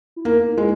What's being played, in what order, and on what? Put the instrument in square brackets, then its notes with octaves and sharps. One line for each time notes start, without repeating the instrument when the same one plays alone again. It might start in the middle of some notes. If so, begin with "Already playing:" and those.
[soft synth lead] E4
[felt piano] A#3 [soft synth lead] D#4
[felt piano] G#3 [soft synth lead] E4